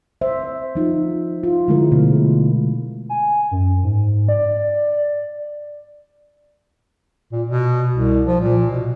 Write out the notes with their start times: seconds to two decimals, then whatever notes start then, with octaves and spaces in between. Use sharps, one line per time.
0.21 C5 E5
0.75 F3 D#4 F4
1.43 F4
1.68 D3 F3 G#3 A3 E4 A#4
1.92 B2 G#3 A3
3.09 G#5
3.51 F#2
3.83 G#2
4.28 D5
7.32 A#2
7.47 B2
7.95 C2
8.26 F3
8.40 A#2
8.71 B2